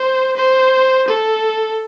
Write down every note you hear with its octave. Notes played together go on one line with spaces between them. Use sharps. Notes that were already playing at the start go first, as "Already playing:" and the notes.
Already playing: C5
C5
A4